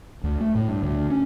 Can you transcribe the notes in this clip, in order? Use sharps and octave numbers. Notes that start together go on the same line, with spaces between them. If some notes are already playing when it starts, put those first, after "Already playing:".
D2
A3
A2
G2
D2
C#4